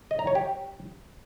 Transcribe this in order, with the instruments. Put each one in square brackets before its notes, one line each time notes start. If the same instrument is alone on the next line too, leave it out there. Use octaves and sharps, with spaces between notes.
[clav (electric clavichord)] D#5
A#5
C#5
G4